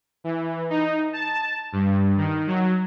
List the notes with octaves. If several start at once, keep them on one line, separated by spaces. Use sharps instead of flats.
E3
D#4
A5
G2
D#3
F#3